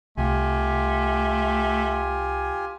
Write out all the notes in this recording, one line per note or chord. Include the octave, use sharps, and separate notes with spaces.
C2 A3 F4 G4 G#5